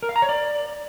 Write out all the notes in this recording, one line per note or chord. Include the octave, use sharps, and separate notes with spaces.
A#4
F5
A#5
C#5
D5